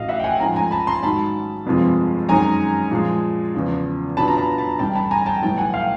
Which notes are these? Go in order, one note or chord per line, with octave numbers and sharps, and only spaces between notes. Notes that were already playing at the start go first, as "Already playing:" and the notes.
Already playing: A1 A2 F#3 D#5 F5
E5 F#5
G5
F#5 G#5
G#2 F3 A3 C#4 G#5 A#5
G#5 A#5
A5 B5
A#5 C6
G#2 D#3 F#3 A5 B5
G1 F2 C3 F3 G#3
F#2 D#3 G#3 C#4 G#5 A#5
A#2 F3 G#3
E2 C#3 F3
A#2 F#3 B3 D4 F4 A5 B5
A#5
A5 B5
A5 B5
A1 G2 D3 G5 A5
A5 B5
G#5 A#5
G#5
G5 A5
B1 A2 E3 G3 G5 A5
F#5 G#5
F5 G5